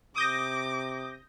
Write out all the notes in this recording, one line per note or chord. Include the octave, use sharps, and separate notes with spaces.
C3 D6 D#6 G6 A#6